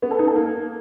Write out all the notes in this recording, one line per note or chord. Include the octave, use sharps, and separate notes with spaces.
B3
A4
D#4
A4
A#3